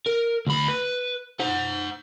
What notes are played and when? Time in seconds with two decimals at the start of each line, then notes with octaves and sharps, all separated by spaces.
0.06 A#4
0.47 D2 B5
0.68 B4
1.40 C5 F#5